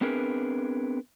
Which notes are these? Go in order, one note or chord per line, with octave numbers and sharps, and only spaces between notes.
B3 C4 D4 G#4 A#4 B4